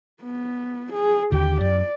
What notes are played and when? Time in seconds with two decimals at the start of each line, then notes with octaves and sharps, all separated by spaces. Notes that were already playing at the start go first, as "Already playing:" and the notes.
0.23 B3
0.93 G#4
1.32 D#2 D3 G4 G5
1.61 F#2 D5